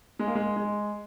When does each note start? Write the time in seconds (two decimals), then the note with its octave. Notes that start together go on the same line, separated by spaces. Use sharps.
0.19 G#3
0.27 A#3
0.35 G#3
0.56 G#3